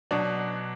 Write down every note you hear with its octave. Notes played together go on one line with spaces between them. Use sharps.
B2 F#3 D4